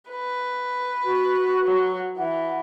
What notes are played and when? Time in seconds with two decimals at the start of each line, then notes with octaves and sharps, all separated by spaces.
0.10 B4
1.04 F#4
1.65 F#3
2.18 E3 F#5